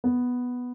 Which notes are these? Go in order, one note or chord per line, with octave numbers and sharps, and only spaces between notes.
B3